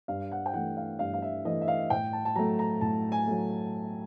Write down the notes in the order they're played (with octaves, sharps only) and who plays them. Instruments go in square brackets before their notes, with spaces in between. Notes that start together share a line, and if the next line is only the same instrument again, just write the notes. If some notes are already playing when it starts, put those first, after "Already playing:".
[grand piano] G2 F5
F#5
G5
E3 A3 F#5
F5
G2 F5
F5
E5
E3 A3 D#5
E5
F5
A2 G5
A5
A5
F#3 A3 A#5
A#5
A2 A5
G#5
F#3 A3